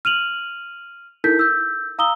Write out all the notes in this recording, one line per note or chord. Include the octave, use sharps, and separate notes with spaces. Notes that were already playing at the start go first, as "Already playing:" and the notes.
F6 D#7 F7 F#7
D#4 E4 A4 A#4 G6 B6
E6 G6
F5 A#5 D#6 E6 G7